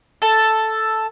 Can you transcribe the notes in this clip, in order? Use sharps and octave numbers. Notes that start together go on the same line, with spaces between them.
A4 A5